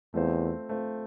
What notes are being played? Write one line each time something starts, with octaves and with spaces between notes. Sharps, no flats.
E2 A3 C4 F4 C5
A3 C4 F4 C5